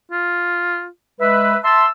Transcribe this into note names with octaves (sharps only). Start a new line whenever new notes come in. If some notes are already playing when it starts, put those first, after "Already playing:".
F4
G#3 B4 E5
E5 A5 C6 E6